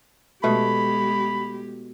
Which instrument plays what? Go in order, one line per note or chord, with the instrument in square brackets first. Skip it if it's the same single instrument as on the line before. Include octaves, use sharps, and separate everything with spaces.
[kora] B2 A3 [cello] G#3 G4 [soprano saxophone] B5